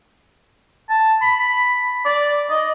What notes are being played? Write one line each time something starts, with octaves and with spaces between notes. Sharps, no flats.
A5
B5
D5
D#5